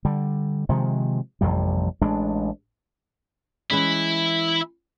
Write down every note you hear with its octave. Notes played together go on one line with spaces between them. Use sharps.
D3 G3
C3 D#3 F3 G#3
A1 F2 C3 G3
A1 G#3 D4
E3 G#3 C#4 E5 B5